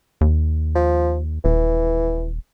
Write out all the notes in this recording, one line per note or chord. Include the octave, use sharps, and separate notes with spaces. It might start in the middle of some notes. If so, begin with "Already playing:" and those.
D#2
F3
D#1 E3